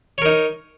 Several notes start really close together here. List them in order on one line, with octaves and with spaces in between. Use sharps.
C#5 A#4 D#4